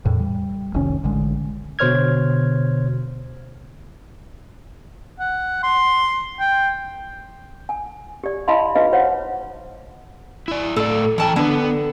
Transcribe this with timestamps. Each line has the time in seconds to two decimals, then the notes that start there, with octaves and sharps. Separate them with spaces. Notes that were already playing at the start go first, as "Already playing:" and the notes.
0.05 E2 A2
0.20 G3
0.74 F1 C2 D#3 C#4
1.04 A1 D3 G#3
1.79 B2 D3 C5 C#5 F6 G#6
5.20 F#5
5.63 C6
6.40 G5
7.69 G#5
8.24 G4 D5
8.48 E4 D#5 F5 A5 B5 C6
8.75 D#4 F#4 G#4 B4 D#5 F5
8.93 C5 C#5 F5 F#5
10.48 E4 D5
10.76 A2 A4 D5
11.18 F2 E3 G5 A5
11.36 D3 B3 B4